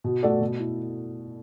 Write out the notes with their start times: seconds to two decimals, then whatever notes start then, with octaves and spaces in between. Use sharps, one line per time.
0.04 B2
0.23 A3 F#4 A4 D5
0.41 B2
0.60 E4